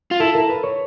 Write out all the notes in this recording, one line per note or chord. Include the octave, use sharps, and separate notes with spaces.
F4
E4 A4
A#4
B4
C#5